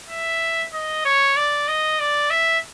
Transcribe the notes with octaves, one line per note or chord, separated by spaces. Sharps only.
E5
D#5
C#5
D5
D#5
D5
E5